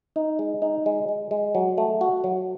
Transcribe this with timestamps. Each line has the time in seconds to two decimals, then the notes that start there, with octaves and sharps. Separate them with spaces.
0.16 D#4
0.39 G#3
0.62 D#4
0.86 G#3
1.09 G#3
1.31 G#3
1.55 F#3
1.78 A3
2.01 F#4
2.24 F#3